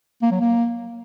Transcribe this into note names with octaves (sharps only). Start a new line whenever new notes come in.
A#3
F#3
A#3